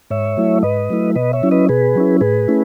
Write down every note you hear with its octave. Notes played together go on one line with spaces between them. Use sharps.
G#2 C#5 E5
F#3 A3 E4
G#2 B4 D#5
F#3 A3 E4
B2 B4 D#5
C#5 E5
F#3 C#4 E4
B4 D#5
B2 G#4 B4
F#3 C#4 E4
A2 G#4 B4
A3 C#4 E4